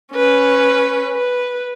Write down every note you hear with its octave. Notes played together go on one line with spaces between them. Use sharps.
C#4 B4
B4